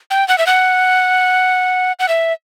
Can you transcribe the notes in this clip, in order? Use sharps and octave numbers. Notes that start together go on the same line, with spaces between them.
G5
F#5
E5
F#5
F#5
E5